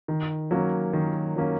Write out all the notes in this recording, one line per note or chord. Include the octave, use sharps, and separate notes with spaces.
D#3
F#3 A#3 C#4
D#3
F#3 A#3 C#4